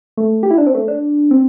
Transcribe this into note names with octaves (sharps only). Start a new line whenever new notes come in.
A3
G4
E4
D4
C4
A3
D4
C4